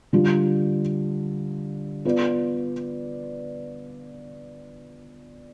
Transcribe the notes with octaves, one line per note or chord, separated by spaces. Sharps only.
D3 G3 D4 F4
B3 F4 B4 D5